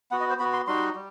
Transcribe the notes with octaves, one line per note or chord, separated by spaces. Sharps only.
B3 F#4 F#5
D#5
C5
B3 F#4 B5
C6
G3 D#4 F#4 C6
G3